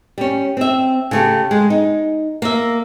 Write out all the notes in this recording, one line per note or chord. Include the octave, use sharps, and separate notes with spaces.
G3 C#4
C4 E5
C#3 A3 G4
G#3
D#4
A#3 E5